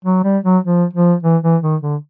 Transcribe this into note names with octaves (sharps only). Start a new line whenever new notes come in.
F#3
G3
F#3
F3
F3
E3
E3
D#3
D3